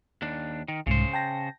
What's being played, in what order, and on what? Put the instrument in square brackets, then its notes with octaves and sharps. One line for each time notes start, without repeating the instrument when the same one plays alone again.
[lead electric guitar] D#2 D4
D#3
[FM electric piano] C2 G#2 [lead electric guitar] C#3 C5
[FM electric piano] G5 A5 A#6